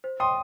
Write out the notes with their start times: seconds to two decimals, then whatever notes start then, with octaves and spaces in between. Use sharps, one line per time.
0.04 C5
0.20 G5 C6 D#6